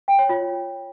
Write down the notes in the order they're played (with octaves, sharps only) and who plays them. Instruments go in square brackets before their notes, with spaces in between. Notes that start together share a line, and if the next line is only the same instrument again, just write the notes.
[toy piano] G5
C#5
F4